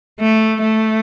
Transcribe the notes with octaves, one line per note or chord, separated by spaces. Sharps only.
A3
A3